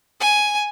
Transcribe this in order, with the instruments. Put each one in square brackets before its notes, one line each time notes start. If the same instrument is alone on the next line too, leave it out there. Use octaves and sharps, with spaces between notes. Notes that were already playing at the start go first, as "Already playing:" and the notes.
[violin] G#5